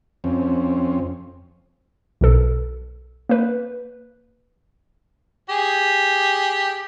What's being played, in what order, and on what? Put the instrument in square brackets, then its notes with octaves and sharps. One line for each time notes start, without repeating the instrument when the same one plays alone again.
[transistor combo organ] F2 C4 C#4
[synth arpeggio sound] B1 B2 A4
A#3 B4
[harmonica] G4 G#4